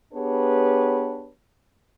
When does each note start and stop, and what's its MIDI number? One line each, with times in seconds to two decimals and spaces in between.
0.13 1.28 59
0.13 1.28 62
0.13 1.28 67
0.13 1.28 68
0.13 1.28 71
0.13 1.28 73